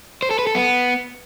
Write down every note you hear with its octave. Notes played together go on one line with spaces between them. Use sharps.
C5
A4
B4
A4
B3